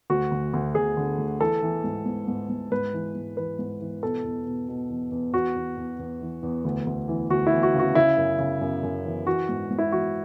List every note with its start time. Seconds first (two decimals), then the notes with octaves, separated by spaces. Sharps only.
0.10 D2 F#4
0.31 D2
0.53 D2
0.75 D2 G#4
0.97 D3
1.18 D2
1.40 E3 A4
1.62 E3
1.84 G#2
2.06 G#2
2.28 G#2
2.50 G#2
2.72 G#2 B4
2.93 E3
3.15 G#2
3.37 E3 B4
3.59 G#2
3.81 E3
4.02 B2 A4
4.24 E2
4.46 B2
4.68 B2
4.90 E2
5.12 E2
5.34 E2 F#4
5.56 E2
5.77 E2
5.99 E2
6.21 E3
6.43 E2
6.65 D2
6.87 D2
7.08 E3
7.30 D2 F#4
7.47 E4
7.52 E3
7.63 F#4
7.74 C#3
7.79 F#4
7.95 C#3 E4
8.17 F#2
8.39 C#3
8.61 F#2
8.83 F#2
9.05 E3
9.26 E3 F#4
9.49 G#2
9.70 G#2
9.78 E4
9.92 E3 F#4